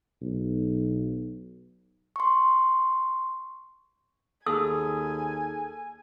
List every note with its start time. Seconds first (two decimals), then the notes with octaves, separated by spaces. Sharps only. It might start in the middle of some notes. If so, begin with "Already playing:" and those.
0.21 B1
2.16 C6 C#6
4.46 D#2 G#4 A4 G#5 D#6